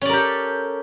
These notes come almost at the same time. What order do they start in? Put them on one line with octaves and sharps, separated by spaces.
C#4 D5 A#4 G4 A4